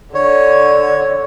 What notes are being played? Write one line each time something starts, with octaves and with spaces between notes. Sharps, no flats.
D3 C#5